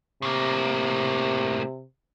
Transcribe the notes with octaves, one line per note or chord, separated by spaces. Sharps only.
A2 C3 A#3